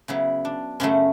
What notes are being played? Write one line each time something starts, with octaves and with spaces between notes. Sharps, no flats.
C#3 F#3 B3 E4
D4
F#2 C#3 F#3 A3 C#4